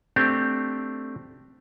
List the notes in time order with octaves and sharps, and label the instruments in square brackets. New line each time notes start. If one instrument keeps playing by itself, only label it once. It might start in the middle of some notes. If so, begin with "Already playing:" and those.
[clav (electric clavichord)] A3 C4 D4 G4